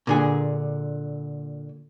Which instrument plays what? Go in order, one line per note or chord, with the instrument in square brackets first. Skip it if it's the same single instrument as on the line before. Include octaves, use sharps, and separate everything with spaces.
[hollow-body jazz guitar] A#2 D3 G#4